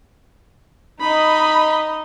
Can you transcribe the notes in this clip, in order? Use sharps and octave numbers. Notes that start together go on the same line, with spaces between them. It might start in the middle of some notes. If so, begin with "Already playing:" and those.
D#4 D#5 B5